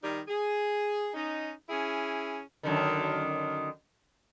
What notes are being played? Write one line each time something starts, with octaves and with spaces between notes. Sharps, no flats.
D#3 G3 D#4
G#4
C#4 D#4
C#4 E4 G#4
F#2 D3 D#3